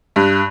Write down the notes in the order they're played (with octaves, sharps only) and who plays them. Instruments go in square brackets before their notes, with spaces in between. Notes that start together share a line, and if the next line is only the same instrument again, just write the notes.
[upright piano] G2